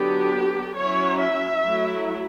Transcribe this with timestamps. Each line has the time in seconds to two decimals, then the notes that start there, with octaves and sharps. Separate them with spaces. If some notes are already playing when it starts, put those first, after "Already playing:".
Already playing: D3 F#3 B3 D4 G4
0.75 F#3 C#4 E4 C#5
1.20 E5
1.63 F#3 A3 E4